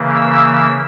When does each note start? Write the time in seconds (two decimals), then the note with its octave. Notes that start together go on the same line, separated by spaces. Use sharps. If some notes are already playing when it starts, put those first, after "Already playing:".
Already playing: C#3 E3 A#3
0.17 E6